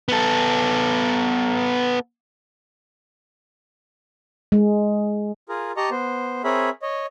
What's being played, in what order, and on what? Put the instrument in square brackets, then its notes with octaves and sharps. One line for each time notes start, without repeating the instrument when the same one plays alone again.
[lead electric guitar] B3 A4
[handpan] G#3
[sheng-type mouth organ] F4 G#4 A#4
G4 D#5 A5 A#5 C#6
B3 C5
C4 G#4 A#4 C#5 E5 B5
C#5 D#5